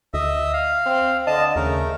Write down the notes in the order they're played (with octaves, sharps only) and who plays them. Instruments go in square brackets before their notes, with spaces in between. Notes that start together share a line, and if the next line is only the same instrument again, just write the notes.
[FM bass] D2 [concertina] D#5 E5
[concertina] F5
[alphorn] C4
[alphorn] D3 [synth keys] D#5 [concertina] A5
[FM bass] D#2 [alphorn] C#3 [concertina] A3 A#4